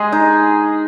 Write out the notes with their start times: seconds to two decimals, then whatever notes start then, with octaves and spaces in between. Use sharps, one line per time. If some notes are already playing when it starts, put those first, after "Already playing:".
Already playing: G#3 G#4
0.12 D#4